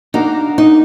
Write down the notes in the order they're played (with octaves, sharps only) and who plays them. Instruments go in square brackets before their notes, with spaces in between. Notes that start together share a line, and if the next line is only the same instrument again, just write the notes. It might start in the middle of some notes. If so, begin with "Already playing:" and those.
[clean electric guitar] A#3 D4 F#4 A#4 [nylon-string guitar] D#4
[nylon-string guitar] D#4